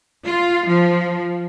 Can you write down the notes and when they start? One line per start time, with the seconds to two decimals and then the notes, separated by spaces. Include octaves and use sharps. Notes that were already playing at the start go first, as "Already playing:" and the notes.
0.25 F4
0.67 F3